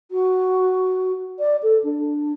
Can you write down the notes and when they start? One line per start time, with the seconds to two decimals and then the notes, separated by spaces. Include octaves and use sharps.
0.11 F#4
1.39 D5
1.62 A4
1.83 D4